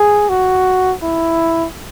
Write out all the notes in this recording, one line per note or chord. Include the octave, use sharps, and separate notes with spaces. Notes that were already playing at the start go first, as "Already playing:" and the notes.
Already playing: G#4
F#4
E4